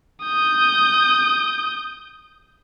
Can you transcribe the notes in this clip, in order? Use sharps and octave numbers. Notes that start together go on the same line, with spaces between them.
D#6 G6